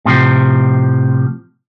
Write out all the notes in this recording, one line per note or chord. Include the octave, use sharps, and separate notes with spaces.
A2 C3 F3